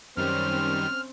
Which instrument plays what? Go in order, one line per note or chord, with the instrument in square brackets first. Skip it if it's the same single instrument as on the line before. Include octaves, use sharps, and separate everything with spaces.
[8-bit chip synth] F#2 D#3 G3 [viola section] C4 C#4 C5 [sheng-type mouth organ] F6